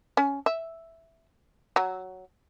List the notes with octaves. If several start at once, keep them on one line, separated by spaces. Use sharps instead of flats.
C#4
E5
F#3